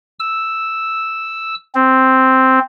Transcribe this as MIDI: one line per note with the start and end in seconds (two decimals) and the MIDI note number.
0.20 1.55 88
1.75 2.59 60